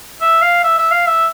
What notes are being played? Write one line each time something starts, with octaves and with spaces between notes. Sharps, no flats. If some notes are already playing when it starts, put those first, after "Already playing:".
E5
F5
E5
E5
F5
E5